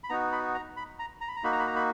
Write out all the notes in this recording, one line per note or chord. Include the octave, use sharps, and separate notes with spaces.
B5
B3 D#4 F#4 A#5
B5
A#5
B5
A#5
A#5
B5
A#5
A#3 D#4 F#4 B5
A#5
B5
A#5
B5